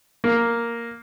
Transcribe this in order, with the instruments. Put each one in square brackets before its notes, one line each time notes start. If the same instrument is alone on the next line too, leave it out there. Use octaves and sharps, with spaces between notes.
[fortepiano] A#3